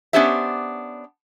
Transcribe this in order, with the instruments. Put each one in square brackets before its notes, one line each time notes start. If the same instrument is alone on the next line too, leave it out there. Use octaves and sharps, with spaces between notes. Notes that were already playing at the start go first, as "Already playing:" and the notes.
[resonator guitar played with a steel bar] B3 C#4 D4 G4 C5 E5